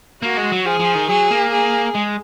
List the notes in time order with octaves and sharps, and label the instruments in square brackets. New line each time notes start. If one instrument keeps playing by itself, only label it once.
[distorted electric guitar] A#3 [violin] F#4
[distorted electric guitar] G#3
F#3
[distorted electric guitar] F3 [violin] G#4
[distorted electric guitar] F3
D#3
[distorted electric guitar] F#3 [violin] G#4
[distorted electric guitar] A#3
[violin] G#4
[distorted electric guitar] G#3